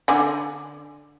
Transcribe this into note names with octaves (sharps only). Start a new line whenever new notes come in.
D3 G#5